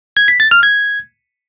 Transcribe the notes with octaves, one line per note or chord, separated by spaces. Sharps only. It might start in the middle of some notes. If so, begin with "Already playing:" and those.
G#6
B6
A6
F6
G#6